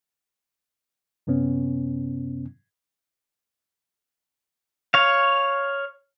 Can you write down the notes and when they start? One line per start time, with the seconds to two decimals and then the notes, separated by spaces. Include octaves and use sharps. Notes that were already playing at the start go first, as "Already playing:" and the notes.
1.27 F#2 C3 B3 C#4
4.94 C#5 F5